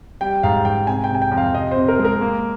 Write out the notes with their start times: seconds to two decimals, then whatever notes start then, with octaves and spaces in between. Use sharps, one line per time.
0.21 G3 G5
0.43 G#2 F5
0.65 G#2 G5
0.87 C3 G#5
1.04 G5
1.10 C3 G#5
1.22 G5
1.32 F2
1.37 F5
1.54 C3 D#5
1.71 C5
1.76 C3
1.88 A#4
1.99 G#3
2.05 A#4
2.21 A#3